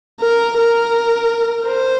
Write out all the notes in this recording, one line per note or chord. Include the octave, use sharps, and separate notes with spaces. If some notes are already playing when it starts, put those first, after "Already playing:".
A#4
A#4
C5